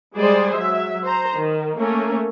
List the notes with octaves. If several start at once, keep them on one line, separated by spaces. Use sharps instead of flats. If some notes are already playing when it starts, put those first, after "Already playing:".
G3 G#3 G#4 C5 D5
F#3 E5
C5 A#5
D#3
A3 A#3 C#4 A#4